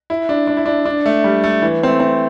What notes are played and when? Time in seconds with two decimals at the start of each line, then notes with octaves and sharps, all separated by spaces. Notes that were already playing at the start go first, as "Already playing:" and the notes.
0.10 E4
0.29 D4
0.47 D4
0.57 E4
0.66 D4
0.85 D4
1.06 A3
1.24 G3
1.44 A3
1.62 E3
1.83 C4
1.87 A3
2.00 C4